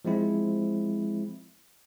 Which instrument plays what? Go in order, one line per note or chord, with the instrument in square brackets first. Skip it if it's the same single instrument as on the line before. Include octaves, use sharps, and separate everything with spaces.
[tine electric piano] F3 G#3 C4 E4